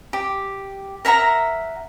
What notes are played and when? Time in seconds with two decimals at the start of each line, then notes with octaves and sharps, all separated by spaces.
0.13 G4
1.05 A#4 E5 F#5 A#5